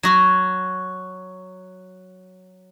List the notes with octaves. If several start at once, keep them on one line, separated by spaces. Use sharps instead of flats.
F#3 F#4